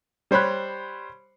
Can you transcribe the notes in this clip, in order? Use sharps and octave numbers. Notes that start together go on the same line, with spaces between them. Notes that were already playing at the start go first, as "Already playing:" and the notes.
G3 C5 C#5 B5 F#6